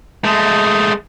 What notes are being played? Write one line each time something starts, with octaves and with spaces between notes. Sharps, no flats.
G#3 A3